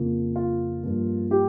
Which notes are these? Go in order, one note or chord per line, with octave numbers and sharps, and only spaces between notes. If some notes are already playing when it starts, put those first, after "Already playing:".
Already playing: F2 C#3 F3 A#3
F4
G2 F3 A#3
G4